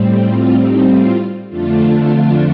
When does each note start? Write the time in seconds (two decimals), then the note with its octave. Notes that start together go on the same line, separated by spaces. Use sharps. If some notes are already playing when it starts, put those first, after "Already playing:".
Already playing: A2 G3 C4
0.24 F4
0.56 D#4
0.87 F4
1.50 F2 D3 A3 D4 F4
1.97 F4